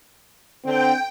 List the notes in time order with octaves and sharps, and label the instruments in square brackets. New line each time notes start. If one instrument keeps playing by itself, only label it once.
[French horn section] D3 C4 [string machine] G5